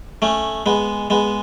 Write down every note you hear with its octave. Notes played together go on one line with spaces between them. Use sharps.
A3 C#4
G#3 B3
G#3 B3